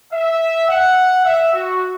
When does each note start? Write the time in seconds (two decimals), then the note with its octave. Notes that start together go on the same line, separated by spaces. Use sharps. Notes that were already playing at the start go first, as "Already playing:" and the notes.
0.13 E5
0.69 F#5
1.25 E5
1.54 F#4